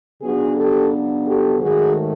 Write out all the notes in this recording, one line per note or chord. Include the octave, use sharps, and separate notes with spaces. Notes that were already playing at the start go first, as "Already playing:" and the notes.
C#3 F#3 B3 D4 F#4 G#4
G4 A4
G4 A4
G#2 D#3 F#3 A3 F#4 G#4